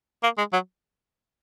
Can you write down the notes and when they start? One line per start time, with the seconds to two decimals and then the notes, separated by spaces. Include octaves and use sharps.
0.23 A#3
0.38 G#3
0.53 F#3